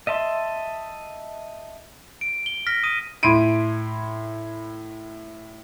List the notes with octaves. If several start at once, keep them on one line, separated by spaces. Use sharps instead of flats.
D#5 E5 A5 C6
D7
G7
F6 A#6 B6
D#6 D#7
A2 E4 B5 C6 D7 D#7